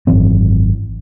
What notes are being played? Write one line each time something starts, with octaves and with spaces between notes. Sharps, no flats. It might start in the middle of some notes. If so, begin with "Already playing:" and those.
G#1 F#2 E3 C4